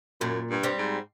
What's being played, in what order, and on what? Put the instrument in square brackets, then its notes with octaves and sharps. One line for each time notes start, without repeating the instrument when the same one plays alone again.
[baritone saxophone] F#2 [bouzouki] A#2
[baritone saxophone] G2
[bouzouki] G3 C4
[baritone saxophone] G#2